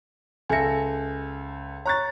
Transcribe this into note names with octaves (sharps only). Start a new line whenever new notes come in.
C#2 A4 E5 G#5 A#6 C#7
C#5 A#5 C#6 F#6 A6